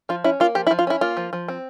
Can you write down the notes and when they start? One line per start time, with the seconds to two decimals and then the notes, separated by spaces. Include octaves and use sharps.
0.09 F3 F4
0.24 C#4 E4
0.40 A#3 F4
0.55 F3 G4
0.67 E4
0.71 F3
0.79 F4
0.87 C#4 E4
1.01 A#3 F4
1.17 F3
1.33 F3
1.48 C4